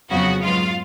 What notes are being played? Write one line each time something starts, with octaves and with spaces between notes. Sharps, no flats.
F2 C#3 F#3 B3 F#4 F#5
G#2 F#3 B3 F4 F5